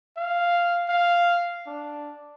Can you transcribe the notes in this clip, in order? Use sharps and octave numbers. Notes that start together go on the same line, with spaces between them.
F5
F5
D4